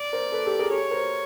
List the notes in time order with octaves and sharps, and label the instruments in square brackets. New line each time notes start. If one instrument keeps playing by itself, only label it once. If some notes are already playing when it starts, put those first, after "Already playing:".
Already playing: [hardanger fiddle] D5
[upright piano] A#4 C5
A4 B4
G4 A4
G#4 A#4
[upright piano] G4 A4 [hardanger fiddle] C#5
[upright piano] A#4 C5